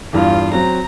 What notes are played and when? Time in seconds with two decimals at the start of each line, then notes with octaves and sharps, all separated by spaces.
0.13 E2 G2 F4 F5
0.53 F#3 C4 A#5